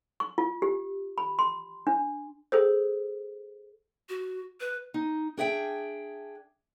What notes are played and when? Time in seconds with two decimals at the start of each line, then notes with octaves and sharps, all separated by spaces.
0.20 C#6
0.38 F4
0.62 G4
1.18 B5
1.39 C6
1.87 D4
2.52 G#4 A4 C5
4.09 F#4
4.61 B4
4.94 D#4
5.37 D4 G#4 E5 G5